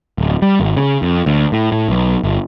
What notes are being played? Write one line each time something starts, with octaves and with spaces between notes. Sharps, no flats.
D1
G3
G#1
C#3
F2
D2
A2
A2
B1
G1